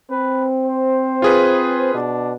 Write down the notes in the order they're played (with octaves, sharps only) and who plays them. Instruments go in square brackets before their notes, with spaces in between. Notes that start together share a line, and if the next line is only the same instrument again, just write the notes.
[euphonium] C4 [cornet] B4
[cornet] C5
[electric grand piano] F4 G#4 B4
[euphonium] B2 [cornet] D4